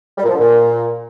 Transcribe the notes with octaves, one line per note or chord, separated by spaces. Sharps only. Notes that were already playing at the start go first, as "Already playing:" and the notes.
G3
A#2
F3
D3
A#2